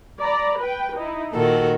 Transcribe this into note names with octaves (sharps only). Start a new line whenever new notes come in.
D5 A#5 B5
B4 G5
D#4 E4
A#2 D#3 F#4 A4